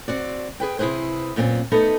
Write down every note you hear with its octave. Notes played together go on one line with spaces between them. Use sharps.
C4 F#4 D5
G#4 B4 G5
C3 E4 G#4 B4 C5
F#2 A#2 B3 C4
A3 B3 D#4 A4 B4